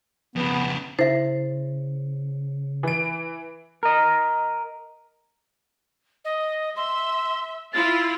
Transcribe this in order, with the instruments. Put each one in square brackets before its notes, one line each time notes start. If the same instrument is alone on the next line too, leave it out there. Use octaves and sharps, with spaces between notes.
[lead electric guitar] F2 C#3 [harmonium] B3
[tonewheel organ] C#3 [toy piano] E4 E5 [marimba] C5
[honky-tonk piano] E3 D7
[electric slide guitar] A#4 D#5
[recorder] D#5
[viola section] E5 [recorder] C6
[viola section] E4 F4 [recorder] A6